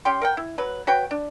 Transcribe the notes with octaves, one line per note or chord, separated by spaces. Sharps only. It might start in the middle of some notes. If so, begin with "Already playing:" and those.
C#4 G4 G5 C6
A#4 F#5 G5
E4
F#3 B4
F#4 B4 C#5 G5
D4